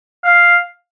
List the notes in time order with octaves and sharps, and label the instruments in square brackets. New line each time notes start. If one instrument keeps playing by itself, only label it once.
[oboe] F5